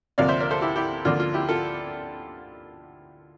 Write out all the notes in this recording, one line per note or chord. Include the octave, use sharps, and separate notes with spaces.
D2 C3 F3 A#3 D5 F5
C5 E5
A#4 D5
A4 C5
E4 G4
E4 G4
D2 D3 F3 A#3 D4 F4
F4
E4 G4
F4 A4